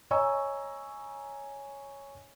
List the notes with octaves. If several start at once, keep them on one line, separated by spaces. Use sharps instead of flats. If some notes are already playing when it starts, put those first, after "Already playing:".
C#5 D#5 G#5 A#5 C#6 E6